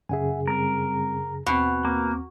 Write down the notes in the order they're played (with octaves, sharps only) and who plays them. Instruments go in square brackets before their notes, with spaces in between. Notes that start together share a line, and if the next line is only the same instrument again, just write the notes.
[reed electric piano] F#2 C#3 G#4 [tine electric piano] E5 F#5 G#5
[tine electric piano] G3 C4 [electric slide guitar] A#4
[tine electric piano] D#2 C4 [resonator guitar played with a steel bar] B2
[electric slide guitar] A#3